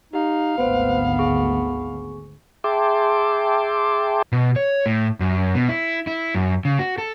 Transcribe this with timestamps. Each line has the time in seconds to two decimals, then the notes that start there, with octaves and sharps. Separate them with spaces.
0.13 D#4 G4 F5
0.58 G#1 D2 B3 B4 C5
1.19 G#4 C#6
2.64 G#4 E5 G5 A5 C6 D6
4.32 B2
4.56 C#5
4.86 A2
5.20 F#2
5.55 B2
5.69 E4
6.07 E4
6.35 F#2
6.65 C#3
6.79 F#4
6.98 A4